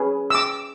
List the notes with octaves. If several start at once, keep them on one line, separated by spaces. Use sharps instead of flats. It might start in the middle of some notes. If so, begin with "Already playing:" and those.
Already playing: C#4 G#4 B4
E6
D6